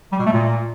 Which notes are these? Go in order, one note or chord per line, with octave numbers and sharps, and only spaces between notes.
G3
B2
A3
A#2